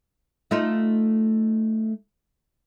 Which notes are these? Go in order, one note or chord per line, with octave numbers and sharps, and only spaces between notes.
A3 D#4 F4